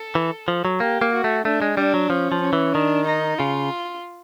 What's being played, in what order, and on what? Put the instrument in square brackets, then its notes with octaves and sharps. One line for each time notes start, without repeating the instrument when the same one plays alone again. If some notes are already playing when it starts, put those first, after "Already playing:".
Already playing: [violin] A4
[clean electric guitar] E3
F3
F#3
[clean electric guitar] A#3 [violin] G4
[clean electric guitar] A#3
[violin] F#4
[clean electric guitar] A3
[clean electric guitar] A3 [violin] D4
[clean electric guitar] G#3
[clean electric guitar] G3 [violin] D4
[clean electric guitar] F#3
[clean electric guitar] F3 [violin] C#4
[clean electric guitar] F3
[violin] C#4
[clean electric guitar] E3
[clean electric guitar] D#3 [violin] D4
[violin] D#4
[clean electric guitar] C#3 [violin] F4